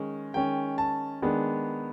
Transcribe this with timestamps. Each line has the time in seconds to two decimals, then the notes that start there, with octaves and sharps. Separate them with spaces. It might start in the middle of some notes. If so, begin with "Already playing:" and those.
Already playing: D#3 G#3 C#4
0.34 D#3 G#3 C#4 G5
0.78 A5
1.22 D#3 G#3 B3 D4